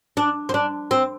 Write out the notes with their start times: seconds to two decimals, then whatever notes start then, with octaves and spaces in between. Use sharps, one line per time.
0.17 D4
0.49 C4
0.54 D4
0.91 C4